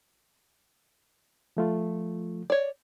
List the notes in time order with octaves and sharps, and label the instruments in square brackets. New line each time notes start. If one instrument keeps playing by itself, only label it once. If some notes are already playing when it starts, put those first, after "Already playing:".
[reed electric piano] F3 A3 F4
[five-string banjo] C#5 D5